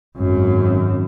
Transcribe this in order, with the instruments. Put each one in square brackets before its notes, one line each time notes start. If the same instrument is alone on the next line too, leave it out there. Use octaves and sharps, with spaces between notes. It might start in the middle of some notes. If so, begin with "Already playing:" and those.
[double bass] G#1 F#2